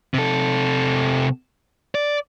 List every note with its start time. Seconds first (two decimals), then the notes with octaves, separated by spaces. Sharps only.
0.14 C3 A4
1.95 D5